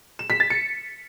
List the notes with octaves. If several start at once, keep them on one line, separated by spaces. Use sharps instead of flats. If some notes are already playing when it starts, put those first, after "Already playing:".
E7
B6
A6
C#7